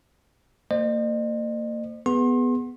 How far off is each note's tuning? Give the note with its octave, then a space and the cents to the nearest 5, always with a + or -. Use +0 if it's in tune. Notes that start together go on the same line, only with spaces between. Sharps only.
A#3 -30 C5 +0 D#5 -40
B3 +0 G#4 +0 C6 +35